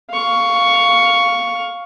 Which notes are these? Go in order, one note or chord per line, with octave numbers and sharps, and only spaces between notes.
F5 C#6